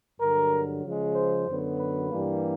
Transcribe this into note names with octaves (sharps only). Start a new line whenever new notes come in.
G2 D3 F#3 A#4
C#3 F3 G#3
C5
F#2 D3 F#3 B3
B4
G2 E3 G3 A#3